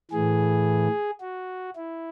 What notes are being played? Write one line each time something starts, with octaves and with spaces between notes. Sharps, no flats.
A2 E3 G#4
F#4
E4